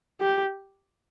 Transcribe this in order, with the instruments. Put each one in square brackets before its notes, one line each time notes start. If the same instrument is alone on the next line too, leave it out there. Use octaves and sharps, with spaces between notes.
[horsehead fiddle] G4